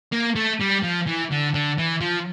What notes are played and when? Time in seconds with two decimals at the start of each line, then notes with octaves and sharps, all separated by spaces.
0.12 A#3
0.35 A3
0.60 G3
0.82 F3
1.06 E3
1.31 D3
1.54 D3
1.78 E3
2.01 F3